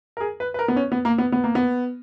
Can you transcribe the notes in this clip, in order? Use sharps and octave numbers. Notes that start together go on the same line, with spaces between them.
A#4
G#4
B4
B4
A#4
B3
C#4
B3
A#3
B3
B3
A#3
B3